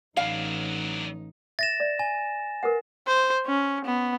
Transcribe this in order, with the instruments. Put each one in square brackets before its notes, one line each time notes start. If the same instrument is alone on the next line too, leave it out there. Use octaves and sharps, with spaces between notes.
[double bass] A1 D#4 [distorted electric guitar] F#3 D4 [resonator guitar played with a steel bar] F5
[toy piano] E5 [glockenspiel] A6 A#6 E7
[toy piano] D5
[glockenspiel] G#5
[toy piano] A#4 B4 F#5
[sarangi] C5
C#4
B3